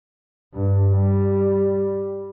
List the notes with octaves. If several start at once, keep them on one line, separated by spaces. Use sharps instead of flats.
G2
G3